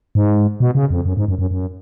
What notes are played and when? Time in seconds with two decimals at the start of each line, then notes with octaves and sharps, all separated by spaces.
0.15 G#2
0.60 B2
0.75 C#3
0.90 F2
1.05 F#2
1.17 G#2
1.28 F#2
1.39 F#2
1.51 F#2